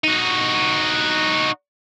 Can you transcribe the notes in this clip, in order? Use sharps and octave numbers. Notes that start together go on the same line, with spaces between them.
D#4 F#4